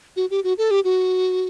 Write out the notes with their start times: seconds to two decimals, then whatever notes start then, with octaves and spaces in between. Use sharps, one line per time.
0.16 F#4
0.31 G4
0.44 F#4
0.58 A4
0.71 G4
0.84 F#4